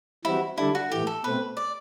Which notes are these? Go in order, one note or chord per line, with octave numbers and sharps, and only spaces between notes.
E3 G3 C4 E4 F#4
D3 G3 D4 E4 A4
F#4
A2 E3 A3 G4
A4
B2 A3 C4 B4
D5